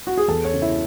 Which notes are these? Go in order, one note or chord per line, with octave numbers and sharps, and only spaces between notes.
F#4
G#4
E2 A4
C#5
C#3
E4